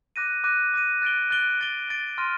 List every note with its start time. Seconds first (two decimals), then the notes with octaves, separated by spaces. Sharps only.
0.16 D6 F#6 A#6 D#7
0.44 D6 F#6 A#6 D#7
0.74 D6 F#6 A#6 D#7
1.02 F#6 A6 D7 G7
1.31 F#6 A6 D7 G7
1.61 F#6 A6 D7 G7
1.89 F#6 A6 D7 G7
2.18 C6 F6 A#6 D#7